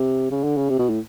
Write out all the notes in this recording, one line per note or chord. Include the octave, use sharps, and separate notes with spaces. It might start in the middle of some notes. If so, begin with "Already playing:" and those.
Already playing: C3
C#3
D3
C#3
C3
B2
A2